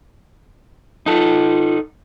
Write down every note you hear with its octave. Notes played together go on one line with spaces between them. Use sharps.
D#4 F4 A4